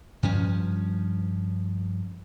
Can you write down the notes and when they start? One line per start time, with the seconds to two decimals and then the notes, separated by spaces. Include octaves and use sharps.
0.23 G2 F3 C#4